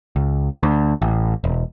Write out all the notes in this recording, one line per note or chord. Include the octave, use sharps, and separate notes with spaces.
C#2
D2
A1
E1